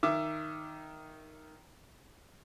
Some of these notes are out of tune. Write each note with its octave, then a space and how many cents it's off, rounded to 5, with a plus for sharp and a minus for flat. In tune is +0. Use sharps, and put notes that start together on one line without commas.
D#3 +0 E5 +20 D6 +0